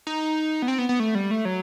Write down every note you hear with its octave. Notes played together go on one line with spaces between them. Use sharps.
D#4
B3
C4
B3
B3
A3
G3
A3
F#3